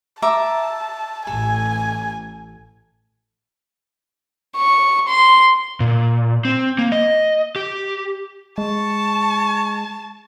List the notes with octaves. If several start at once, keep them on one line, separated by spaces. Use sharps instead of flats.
E5 A5 A#5 D6
A1 A4 G#5
C#6
C6
A#2
C4
A#3
D#5
G4
G#3 A5 C#6